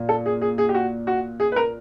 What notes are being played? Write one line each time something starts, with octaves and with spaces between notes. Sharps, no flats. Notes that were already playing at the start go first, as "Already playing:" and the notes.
Already playing: A#2
A4
G#4
G#4
G#4
G4
F#4
F#4
G#4
B4
A#4